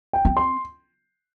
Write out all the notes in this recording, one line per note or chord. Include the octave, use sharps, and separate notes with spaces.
G5
C4
C6